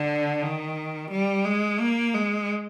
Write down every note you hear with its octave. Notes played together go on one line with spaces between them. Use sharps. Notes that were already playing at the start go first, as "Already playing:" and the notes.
Already playing: D3
D#3
G3
G#3
A#3
G#3